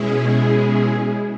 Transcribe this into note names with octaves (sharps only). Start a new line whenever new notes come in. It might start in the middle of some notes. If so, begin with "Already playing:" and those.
Already playing: B2 G#3 C#4 E4 G#4